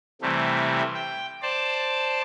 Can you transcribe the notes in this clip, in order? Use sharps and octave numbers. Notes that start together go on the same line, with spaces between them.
C3 E3 G3 A3
G5
C5 D5 A5